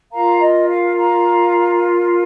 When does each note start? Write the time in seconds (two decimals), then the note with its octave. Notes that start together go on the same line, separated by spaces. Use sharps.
0.11 F4 A#4 F5 A#5
0.40 D#5
0.67 F5
0.96 F5 A#5